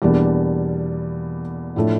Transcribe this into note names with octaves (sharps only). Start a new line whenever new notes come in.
E2 B2 G3 A#3 D4
A2 F3 A3 D4